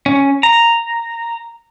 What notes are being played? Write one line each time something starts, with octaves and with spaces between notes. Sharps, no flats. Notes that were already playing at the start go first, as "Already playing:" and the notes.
C#4
A#5